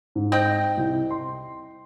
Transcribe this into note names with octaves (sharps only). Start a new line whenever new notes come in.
G#2
C4 D#5 G5
C2
C6